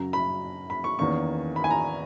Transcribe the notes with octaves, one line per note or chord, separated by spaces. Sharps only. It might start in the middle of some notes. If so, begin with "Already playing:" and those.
Already playing: F#2 C#3 F#3 A#5
B5
B5
C#6
E2 D#3 A#3 C#4 C#6
B5
G#5
A#5